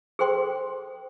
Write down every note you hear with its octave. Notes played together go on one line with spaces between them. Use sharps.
G#4 A4 C5 G5 C6